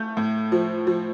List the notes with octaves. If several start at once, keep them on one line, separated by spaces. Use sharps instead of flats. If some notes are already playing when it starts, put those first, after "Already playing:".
Already playing: A3 G6
A2
F3
F3